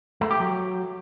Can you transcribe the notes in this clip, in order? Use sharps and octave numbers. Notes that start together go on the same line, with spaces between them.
A3
G4
F#3